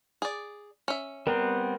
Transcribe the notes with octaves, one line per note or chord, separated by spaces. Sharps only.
G#4 D5
C#4 E5
G3 B3 C4 A#4